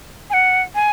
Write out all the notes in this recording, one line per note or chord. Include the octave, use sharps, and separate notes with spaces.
G#5
F#5
G#5